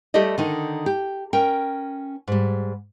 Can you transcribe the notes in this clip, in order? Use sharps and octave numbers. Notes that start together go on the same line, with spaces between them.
G3 A3 G4 A4 D5 D#5
D3 D#3 D#4
G4
C#4 A#4 G5
G#2 G3